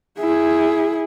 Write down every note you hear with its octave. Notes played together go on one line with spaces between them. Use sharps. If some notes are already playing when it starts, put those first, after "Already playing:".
E4 G#4